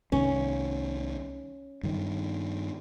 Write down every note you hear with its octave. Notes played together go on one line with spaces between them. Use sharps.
C2 D#3 C#4
G2 D#3